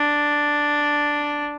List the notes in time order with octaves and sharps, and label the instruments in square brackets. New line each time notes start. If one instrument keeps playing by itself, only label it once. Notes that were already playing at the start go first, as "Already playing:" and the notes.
Already playing: [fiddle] D4